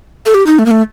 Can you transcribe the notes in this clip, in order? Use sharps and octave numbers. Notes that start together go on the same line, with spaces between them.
A4
G4
D#4
A3
A#3
A3